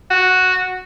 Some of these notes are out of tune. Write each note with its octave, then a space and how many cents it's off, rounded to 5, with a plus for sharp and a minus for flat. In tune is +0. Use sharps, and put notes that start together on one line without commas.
F#4 +0